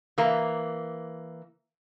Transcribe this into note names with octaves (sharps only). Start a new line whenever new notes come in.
E3 A#3